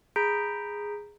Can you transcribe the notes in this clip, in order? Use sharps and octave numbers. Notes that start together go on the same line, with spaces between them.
G#4 A#5 B5 G6 B6 D7